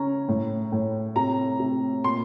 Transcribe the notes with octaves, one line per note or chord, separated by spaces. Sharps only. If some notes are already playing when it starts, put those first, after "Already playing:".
Already playing: C#3 C#4 A#5
A2
A2
C3 A#5
C3
A#2 C6